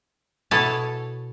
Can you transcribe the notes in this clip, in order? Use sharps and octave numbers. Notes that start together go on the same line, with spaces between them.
B2 E4 A4 C#5 G#5 A5